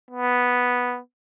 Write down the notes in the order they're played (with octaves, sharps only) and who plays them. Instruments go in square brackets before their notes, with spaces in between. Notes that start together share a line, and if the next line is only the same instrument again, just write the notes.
[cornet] B3